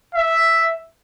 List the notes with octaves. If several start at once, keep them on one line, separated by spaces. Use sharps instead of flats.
E5